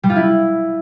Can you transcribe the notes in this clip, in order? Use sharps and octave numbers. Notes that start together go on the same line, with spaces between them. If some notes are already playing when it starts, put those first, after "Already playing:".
G3
F4
E4